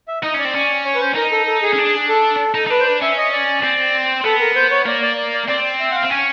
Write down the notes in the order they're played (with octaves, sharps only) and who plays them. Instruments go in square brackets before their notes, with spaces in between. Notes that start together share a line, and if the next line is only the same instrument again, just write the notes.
[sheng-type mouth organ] E5
[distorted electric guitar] D#4 [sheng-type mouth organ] D#5
[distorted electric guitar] C#4 [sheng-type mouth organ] D5
[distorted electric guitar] C4
C#4
[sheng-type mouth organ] C#5
B4
C5
[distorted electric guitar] D#4 [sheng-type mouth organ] A#4
[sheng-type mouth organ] A4
A4
G#4
[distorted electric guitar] C#4
D4
[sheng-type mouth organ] A4
[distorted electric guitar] D#4
D#4
[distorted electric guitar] D4 [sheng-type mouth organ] B4
[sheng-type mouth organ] C5
B4
[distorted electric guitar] C#4 [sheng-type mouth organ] E5
[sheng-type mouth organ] D#5
D5
[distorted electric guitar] C4
[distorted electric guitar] B3 [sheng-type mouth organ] A4
[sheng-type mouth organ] A#4
C5
C#5
[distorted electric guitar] A#3 [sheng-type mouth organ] D5
[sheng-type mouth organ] D5
D5
D5
[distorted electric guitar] C4 [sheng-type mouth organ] D5
[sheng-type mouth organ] E5
F#5
F5
[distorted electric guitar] C4
[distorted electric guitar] C#4 [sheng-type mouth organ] G#5